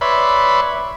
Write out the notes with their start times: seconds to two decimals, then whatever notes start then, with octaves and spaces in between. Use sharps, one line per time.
0.01 B4 C#5 D5 E5 B5 C6